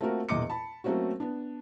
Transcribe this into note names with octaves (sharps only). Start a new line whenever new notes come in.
A3 A#3 C4 F4 F#4 A#4
E1 E2 A#2 D#5 D6 C#7
A5 B5
F#3 A3 A#3 C4 C#4 F#4
B3 D4